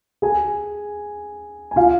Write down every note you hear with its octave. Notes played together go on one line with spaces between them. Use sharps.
G#4 G#5
G#5
F4 F5